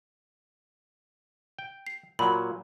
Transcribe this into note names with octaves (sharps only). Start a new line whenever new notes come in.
G5
C7
A#2 F#3 B5